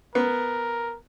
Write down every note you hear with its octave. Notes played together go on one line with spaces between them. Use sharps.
B3 A#4